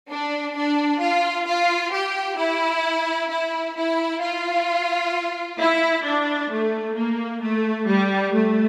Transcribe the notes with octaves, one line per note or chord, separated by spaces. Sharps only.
D4
D4
F4
F4
G4
E4
E4
E4
F4
E4
D4
A3
A#3
A3
G3
A3